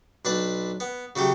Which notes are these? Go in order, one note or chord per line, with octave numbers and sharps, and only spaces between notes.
B1 D4 B4 A5 B5
B3
C#3 F#3 A3 G4